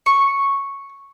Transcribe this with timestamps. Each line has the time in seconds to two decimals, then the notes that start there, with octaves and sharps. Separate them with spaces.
0.06 C#6